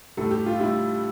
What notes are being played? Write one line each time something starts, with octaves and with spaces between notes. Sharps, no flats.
A2 G3 A4
G4
F4
A2 G3 E4